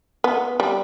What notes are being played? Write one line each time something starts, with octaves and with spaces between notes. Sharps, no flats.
B3
G3